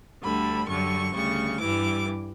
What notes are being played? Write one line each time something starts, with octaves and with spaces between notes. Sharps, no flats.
D2 D3 G3 B5
F#2 D3 G3 C#6
D2 C#3 G3 C#6
G2 E3 G3 D6